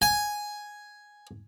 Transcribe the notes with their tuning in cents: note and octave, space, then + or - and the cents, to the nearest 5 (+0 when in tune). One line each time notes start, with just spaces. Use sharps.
G#5 +0